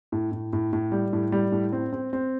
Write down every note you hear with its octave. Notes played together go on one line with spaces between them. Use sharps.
A2
A2
A2
A2
G3
A2
G3
A2
C4
C4
C4